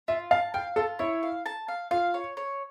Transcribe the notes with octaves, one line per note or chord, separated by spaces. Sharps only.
F4 E5
F5 A5
F5 G5
F4 A4
E4 C#5
F5
A5
F5
F4 F5
C#5
C#5